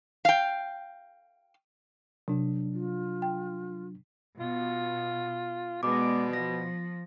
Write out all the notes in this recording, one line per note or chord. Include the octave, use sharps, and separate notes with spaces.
F5 G5
C3 F#3 D4
F4
G5
B2 F4
B2 G#3 B3 D5 D6
F3 A#6